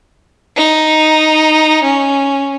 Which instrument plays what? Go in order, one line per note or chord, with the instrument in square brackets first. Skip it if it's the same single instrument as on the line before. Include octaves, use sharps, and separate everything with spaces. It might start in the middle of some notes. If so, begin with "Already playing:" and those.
[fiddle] D#4
C#4